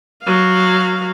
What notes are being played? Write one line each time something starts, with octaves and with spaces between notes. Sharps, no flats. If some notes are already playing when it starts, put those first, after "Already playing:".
F#3 F5